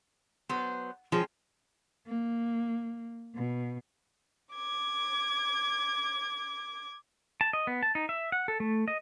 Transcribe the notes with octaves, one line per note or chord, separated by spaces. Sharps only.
F#3 B3 C5
F3 G#3 C#4 G5
A#3
B2
D6 G#6
A5
D#5
B3
A5
D#4
E5
F#5
A4
A3
D#5